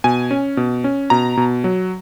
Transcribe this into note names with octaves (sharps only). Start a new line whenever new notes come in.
B2 G#5
C#4
B2
C#4
B2 A#5
B2
F#3